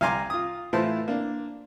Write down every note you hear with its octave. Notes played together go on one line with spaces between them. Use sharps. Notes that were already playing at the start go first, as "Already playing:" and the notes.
C2 F5 G#5 A#5 C6 D6
F4 D#6
A2 E3 E4 F4 C5 A5
A#3 D4